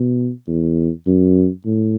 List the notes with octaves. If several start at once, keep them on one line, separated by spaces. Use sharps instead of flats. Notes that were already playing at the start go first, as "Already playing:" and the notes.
Already playing: B2
E2
F#2
A2